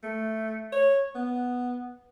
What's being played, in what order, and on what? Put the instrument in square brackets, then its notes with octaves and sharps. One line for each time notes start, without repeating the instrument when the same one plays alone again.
[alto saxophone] A3
C#5
B3